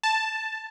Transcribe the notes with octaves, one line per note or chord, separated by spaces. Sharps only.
A5